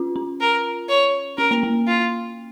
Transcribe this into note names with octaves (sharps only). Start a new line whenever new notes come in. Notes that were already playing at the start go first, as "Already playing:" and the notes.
Already playing: C#4 F4
C#4
A#4
C#5
C#4 A#4
A#3
A#3
F4